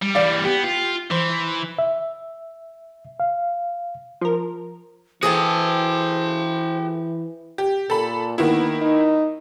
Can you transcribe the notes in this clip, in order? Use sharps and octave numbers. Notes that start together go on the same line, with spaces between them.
G3
E3 G3 D5 F5
B3 G4
F4
E3 C5
E5
F5
F3 A#4
E3 F#4 G#4 A4 C5 G5 A5
G4
A#2 A4 B5
D#3 A#3 B3 E4
D#4